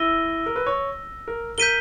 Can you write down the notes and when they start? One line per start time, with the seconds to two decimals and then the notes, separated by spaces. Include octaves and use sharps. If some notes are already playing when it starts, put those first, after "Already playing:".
Already playing: E4 E6 A#6 D#7 G7
0.46 A#4
0.56 B4
0.66 C#5
1.28 A#4
1.58 A#4 G6 B6 D#7 G7